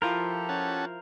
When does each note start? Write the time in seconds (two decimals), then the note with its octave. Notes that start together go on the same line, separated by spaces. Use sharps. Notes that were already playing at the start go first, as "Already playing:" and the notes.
0.02 F3 E4 F4 G4 A4 A#4 C5
0.49 C#4 F#5 A5